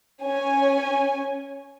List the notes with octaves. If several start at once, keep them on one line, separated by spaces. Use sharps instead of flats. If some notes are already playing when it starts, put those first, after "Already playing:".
C#4 G#5